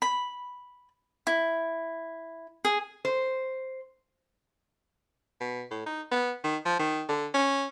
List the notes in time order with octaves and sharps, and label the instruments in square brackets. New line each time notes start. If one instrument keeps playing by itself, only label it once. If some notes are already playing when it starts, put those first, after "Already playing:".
[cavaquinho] B5
E4
G#4
[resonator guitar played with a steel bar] C5
[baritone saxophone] B2
A2
D#4
B3
D#3
F3
D#3
D3
C#4